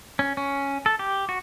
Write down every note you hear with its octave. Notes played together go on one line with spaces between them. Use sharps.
C#4
C#4
A4
G4
F#4